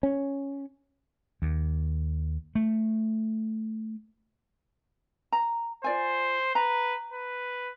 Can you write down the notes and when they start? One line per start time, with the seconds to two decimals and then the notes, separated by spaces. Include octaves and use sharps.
0.03 C#4
1.42 D#2
2.55 A3
5.32 A#5
5.84 F4 C5 D5 G#5
6.55 B4 A#5
7.13 B4